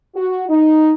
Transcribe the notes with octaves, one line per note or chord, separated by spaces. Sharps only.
F#4
D#4